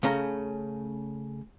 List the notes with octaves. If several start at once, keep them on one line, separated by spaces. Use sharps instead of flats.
C#3 A3 C#4 A#5